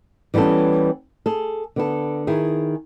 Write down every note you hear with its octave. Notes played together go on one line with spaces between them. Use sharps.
E3 G3 B3 C#4 A4
G#4 A4
D3 B3 A4
D#3 E4 G#4